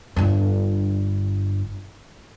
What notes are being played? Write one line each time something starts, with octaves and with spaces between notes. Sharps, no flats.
G1 G2